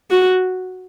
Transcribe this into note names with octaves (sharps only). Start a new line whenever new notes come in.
F#4